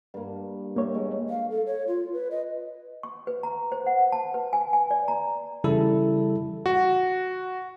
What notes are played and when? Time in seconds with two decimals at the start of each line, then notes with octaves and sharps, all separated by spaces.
0.14 G2 A#3
0.76 A#3 C#5 E5
0.95 G#3
1.30 F5
1.50 A4
1.67 C#5
1.87 F4
2.13 B4
2.31 D#5
3.03 C#6
3.27 B4
3.43 A#5
3.72 C5
3.86 F#5
4.12 A5
4.34 B4
4.53 G#5
4.73 G#5
4.91 D5
5.08 A#5
5.64 C#3 E3 G3 E4 A4
6.66 F#4